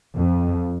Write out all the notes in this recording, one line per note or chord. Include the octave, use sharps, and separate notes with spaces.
F2